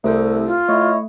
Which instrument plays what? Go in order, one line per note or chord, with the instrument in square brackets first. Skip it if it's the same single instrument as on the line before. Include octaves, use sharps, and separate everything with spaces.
[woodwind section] C2 [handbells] A3 A4 C5
[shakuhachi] F4
[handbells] A3 [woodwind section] E4 C#5 D#5